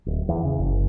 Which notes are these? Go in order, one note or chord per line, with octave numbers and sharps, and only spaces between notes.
D1
E2
C#3
F#1